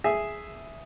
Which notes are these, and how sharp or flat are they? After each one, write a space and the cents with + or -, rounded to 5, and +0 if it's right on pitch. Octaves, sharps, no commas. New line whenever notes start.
G#4 +0 E5 +0